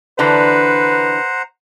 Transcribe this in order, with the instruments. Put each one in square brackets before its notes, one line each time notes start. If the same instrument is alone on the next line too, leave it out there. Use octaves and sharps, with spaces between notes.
[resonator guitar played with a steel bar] D3 E3 [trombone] B4 [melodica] C5 F#5 A#5